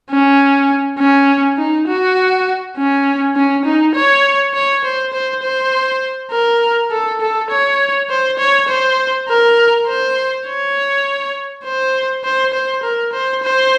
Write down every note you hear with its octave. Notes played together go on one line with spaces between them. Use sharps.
C#4
C#4
D#4
F#4
C#4
C#4
D#4
C#5
C#5
C5
C5
C5
A#4
A4
A4
C#5
C5
C#5
C5
A#4
C5
C#5
C5
C5
C5
A#4
C5
C5